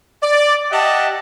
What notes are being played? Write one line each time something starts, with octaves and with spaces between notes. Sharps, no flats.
D5
G4 D#5 E5 F#5 A5